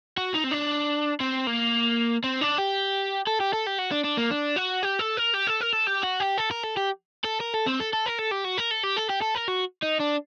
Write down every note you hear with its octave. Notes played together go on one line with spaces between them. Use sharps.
F#4
D#4
C4
D4
C4
A#3
C4
D4
G4
A4
G4
A4
G4
F#4
D4
D4
A#3
D4
F#4
G4
A4
A#4
G4
A4
A#4
A4
G4
F#4
G4
A4
A#4
A4
G4
A4
A#4
A4
C4
A4
A4
A#4
A4
G4
F#4
A#4
A4
G4
A4
G4
A4
A#4
F#4
D#4
D4